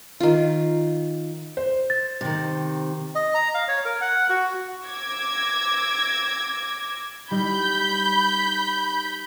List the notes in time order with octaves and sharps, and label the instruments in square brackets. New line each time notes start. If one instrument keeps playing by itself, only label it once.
[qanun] D#3 F4
[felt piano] C5
[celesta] A6
[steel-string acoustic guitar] C3 D#3
[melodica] D#5
A#5
F5
C#5
A#4
F#5
F#4
[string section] D6 E6 G#6 A#6
[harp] G3 D#4 [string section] B5 G6